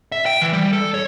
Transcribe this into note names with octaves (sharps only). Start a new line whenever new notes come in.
E5
G5
E3
G3
A4
C#5